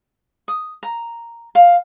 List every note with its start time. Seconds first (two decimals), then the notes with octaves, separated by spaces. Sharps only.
0.48 D#6
0.83 A#5
1.55 F5